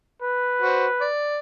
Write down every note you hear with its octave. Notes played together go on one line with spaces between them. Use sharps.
B4
F#4 C5
D5